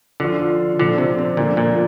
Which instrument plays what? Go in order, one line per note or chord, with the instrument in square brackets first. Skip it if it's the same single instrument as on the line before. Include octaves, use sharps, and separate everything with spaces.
[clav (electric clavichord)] D3 [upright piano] F3 D4 F4
[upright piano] A#2 F3 D4 [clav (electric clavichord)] D3
[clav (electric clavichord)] C3
C3
[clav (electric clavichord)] A#2 [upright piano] D3 F3 D4
[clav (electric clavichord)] A#2